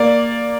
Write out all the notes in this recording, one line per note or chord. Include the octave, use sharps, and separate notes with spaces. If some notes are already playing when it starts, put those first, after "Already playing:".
Already playing: A#3 D5